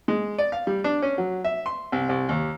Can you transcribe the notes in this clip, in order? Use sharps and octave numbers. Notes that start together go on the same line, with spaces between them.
G#3
D5
F5
G3
D4
C#4
F#3
E5
C6
C2
C2
D#2